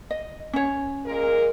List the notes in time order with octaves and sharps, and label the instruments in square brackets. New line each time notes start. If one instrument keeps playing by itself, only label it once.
[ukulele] D#5
C#4 C#5
[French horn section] A#2 G#3 A#4